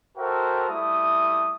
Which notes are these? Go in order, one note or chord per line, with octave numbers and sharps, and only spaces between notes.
F#4 A4 A#4 C5 E5 G5
G3 A3 E4 D#6